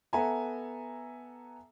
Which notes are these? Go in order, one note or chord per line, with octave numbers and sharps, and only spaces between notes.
B3 A4 E5 F#5 G#5 A#5